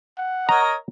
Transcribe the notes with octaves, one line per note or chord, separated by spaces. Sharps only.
F#5
A#4 C#5 D#5 A#5